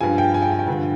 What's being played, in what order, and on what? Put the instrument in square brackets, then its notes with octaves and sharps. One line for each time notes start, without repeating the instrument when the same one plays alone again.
[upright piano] G2 F3 G#5
G5
G#5
G5
G#5
G5
G2 D3 F3